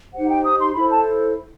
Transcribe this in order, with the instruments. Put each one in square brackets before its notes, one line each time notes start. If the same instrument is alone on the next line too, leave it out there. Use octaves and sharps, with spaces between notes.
[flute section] D#4 G4 C5 F#5
G5
D#6
C6
E4 A4 C5 B5
A5